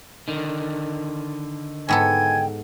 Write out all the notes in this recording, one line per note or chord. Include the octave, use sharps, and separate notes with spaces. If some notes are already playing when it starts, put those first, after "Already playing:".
D3 D#3
G#2 B3 A4 G5 G#5